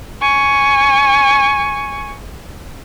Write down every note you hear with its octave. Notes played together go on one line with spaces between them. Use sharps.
G#5 C#6